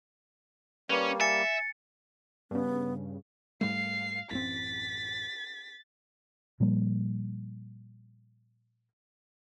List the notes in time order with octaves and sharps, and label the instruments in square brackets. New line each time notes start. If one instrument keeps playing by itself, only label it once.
[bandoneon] G3 A#3 [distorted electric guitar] C#4 [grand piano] B4 D5
[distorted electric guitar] E5 [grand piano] G#5 [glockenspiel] A6 C#7
[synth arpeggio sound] G2 C#3 [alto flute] B3
[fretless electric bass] G#2 G3 A3 [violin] F5 C7
[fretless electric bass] A1 F#2 C4 [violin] A6 B6
[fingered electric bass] A#2 F3 G3 A#3